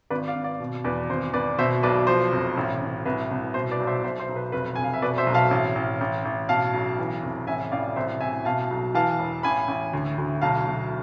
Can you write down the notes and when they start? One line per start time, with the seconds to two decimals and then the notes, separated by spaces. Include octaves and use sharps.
0.10 G#1 B4 D5
0.28 D5 F5
0.35 G#1
0.44 D5 F5
0.60 B2
0.84 E2 B4 D5
1.10 G#1 C5
1.33 G#1 B4 D5
1.58 B2 C5 E5
1.83 B1 B4 D5
2.07 F3 C5
2.32 F1
2.57 A1
2.81 A1
3.05 C2 B4
3.31 C2
3.54 B2 C5
3.71 B4 D5
3.80 B1
3.87 C5 E5
4.03 B1 C5 E5
4.20 C5
4.29 B1
4.36 B4
4.52 F1 B4
4.76 F1 G#5
4.84 F5
4.94 E5
5.02 B2 B4 D5
5.18 C5 E5
5.27 B1
5.34 F5 A5
5.51 A1
5.75 A1
6.01 A1
6.25 A1
6.49 B2 F5 A5
6.74 B1
6.99 E3
7.22 F1
7.47 A1 E5 G#5
7.71 A1 D5 F5
7.96 C2 C5 E5
8.21 C2 E5 G#5
8.45 B2 F5 A5
8.71 B1
8.94 E3 F5 A5
9.19 E1
9.43 A1 G#5 B5
9.68 A1
9.93 D2
10.18 D2
10.41 B1 F5 A5
10.67 B1